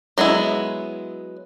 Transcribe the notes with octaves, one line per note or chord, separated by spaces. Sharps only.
F#3 G#3 B3 E4